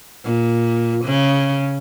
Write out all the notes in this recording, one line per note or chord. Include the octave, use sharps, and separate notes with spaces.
A#2
C#3